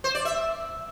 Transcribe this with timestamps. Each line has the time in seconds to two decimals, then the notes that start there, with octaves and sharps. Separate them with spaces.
0.04 C5
0.15 D5
0.25 E5